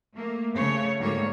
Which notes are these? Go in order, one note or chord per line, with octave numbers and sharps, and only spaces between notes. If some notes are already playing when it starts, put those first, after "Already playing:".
A3 A#3
C#3 A3 C#5
D2 G#2 D3 G3 A#3 C#5